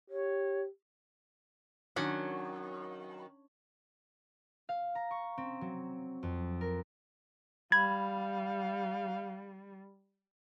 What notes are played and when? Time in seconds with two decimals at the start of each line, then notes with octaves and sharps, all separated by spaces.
0.10 G4 C#5
1.96 D#3 F#3 C#4 D4 F#5
4.69 F5
4.95 A#5
5.11 C#6
5.38 C4
5.61 F#3
6.23 F2
6.61 A#4
7.72 G3 F5 B5 G#6